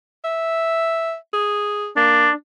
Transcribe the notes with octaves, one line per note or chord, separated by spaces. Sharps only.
E5
G#4
A#3 D4